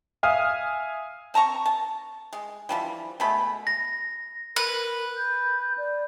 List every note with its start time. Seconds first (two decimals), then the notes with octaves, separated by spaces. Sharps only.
0.23 E5 F5 G#5 D#6 F6
1.34 C4 A5 A#5 C#6
1.66 A5
2.33 G#3
2.69 E3 F3 G3
3.20 B2 G#3 A3 B5
3.67 A#6
4.56 A#4 B4
5.17 G6
5.78 D5